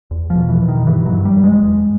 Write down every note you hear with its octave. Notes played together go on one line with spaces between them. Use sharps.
E2
F3
B2
E3
B2
D#3
G2 E3
F#3
G2
G3
G2
G#3
E2